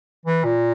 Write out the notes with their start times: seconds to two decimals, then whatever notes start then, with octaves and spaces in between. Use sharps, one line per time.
0.26 E3
0.44 A#2